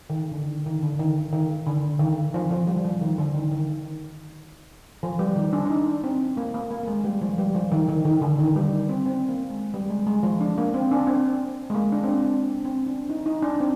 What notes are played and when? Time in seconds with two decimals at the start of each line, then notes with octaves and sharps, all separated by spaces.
0.10 D#3
0.32 D3
0.66 D#3
0.82 D3
1.00 D#3
1.33 D#3
1.67 D3
2.00 D#3
2.34 F3
2.51 F3
2.67 G3
2.85 F3
3.01 D#3
3.18 D3
3.35 D#3
3.52 D#3
5.03 F3
5.19 G3
5.36 D#3
5.53 D4
5.66 D4
5.70 D#4
6.04 C4
6.37 A#3
6.54 A#3
6.71 A#3
6.83 A#3
6.88 G#3
7.04 G3
7.22 F3
7.38 G3
7.55 F3
7.72 D#3
7.89 D#3
8.05 D#3
8.22 D3
8.39 D#3
8.56 G3
8.89 C4
9.06 C4
9.29 A#3
9.50 G#3
9.74 G3
9.90 G#3
10.07 G#3
10.23 F3
10.41 D4
10.58 A#3
10.74 C4
10.91 D4
11.07 C4
11.70 G#3
11.75 A#3
11.92 D4
12.04 C4
12.09 D4
12.25 C4
12.42 D4
12.65 C4
12.87 D4
13.10 D#4
13.26 D#4
13.42 D4
13.60 C4